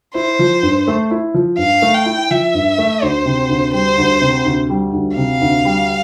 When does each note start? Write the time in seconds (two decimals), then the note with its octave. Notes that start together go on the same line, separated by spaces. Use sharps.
0.15 E4 C5
0.39 F3
0.63 G2
0.88 A3
1.11 E4
1.34 F3
1.58 G2 F5
1.82 A3
1.94 G5
2.06 E4
2.30 F3 E5
2.54 G2
2.78 A3
3.02 D2 C5
3.26 C3
3.49 D2
3.73 G3 C5
3.98 D2
4.22 C3
4.45 D2
4.70 G3
4.93 D2
5.17 C3 F5
5.41 D2
5.65 G3